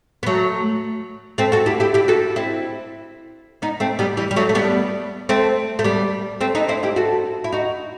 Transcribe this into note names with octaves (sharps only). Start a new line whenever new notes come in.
B3
F#3 A3
A3 C4
F#4 A4
E4 G4
E4 G4
E4 G4
F#4 A4
C4 E4
B3 D#4
A3 C4
G3 B3
E3 G3
G3
F#3 A3
A3
G3 B3
A3 C4
A3
G3 B3
A3 C4
B3 D#4
C4 E4
E4 G4
F#4 A4
E4
D#4 F#4